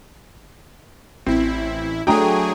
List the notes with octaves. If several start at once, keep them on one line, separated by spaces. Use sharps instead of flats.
A1 C4 E4
F#3 A3 D4 F#4 G#4 G5 A#5 D#6